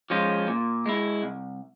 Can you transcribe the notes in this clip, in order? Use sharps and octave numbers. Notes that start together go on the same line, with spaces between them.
F3 G#3 C#4 F4
A#2
G#3 E4
C2